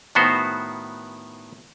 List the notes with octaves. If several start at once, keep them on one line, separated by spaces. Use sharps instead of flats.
A2 D#3 B3 F#4 C5